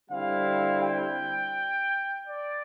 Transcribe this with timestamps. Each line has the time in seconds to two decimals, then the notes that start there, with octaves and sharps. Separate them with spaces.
0.10 D3 G3 C4 E4 F5
0.83 G5
2.27 D5